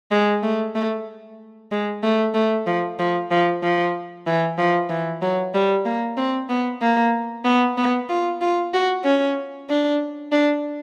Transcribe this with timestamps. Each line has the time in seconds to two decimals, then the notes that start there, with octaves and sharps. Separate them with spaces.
0.11 G#3
0.43 A3
0.75 A3
1.71 G#3
2.03 A3
2.34 A3
2.67 F3
2.99 F3
3.31 F3
3.63 F3
4.27 E3
4.58 F3
4.90 E3
5.22 F#3
5.54 G3
5.85 A#3
6.17 C4
6.49 B3
6.82 A#3
7.45 B3
7.78 B3
8.09 F4
8.41 F4
8.74 F#4
9.04 C#4
9.69 D4
10.32 D4